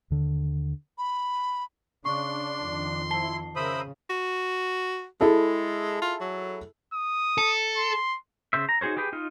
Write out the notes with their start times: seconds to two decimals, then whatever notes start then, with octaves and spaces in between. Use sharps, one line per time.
0.10 D#2 D3
0.98 B5
2.05 C#3 D4 C6 C#6
2.61 F2 D#3
3.11 F3 E4 A5 C7 G7
3.56 C#3 A#4 C5 E5 B5 D#6
4.10 F#4
5.21 G#3 E4 G#4 A4
6.02 F4
6.20 F#3
6.94 D#6
7.38 A4
7.77 C6
8.53 C#3 C5 E5
8.69 A#5
8.81 D#4 F#4 G#4 C5 C#5
8.97 G4 G#4 B4 G5
9.13 D#4 F4